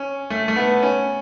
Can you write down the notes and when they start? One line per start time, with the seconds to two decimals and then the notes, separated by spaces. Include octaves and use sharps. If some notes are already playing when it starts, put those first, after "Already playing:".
Already playing: C#4
0.30 A3
0.48 A3
0.56 B3
0.83 C#4